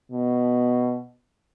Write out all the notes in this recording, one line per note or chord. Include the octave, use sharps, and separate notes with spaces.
B2